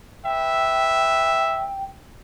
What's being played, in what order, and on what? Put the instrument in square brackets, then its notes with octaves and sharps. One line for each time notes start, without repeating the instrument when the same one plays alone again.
[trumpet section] B4 E5 [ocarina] G5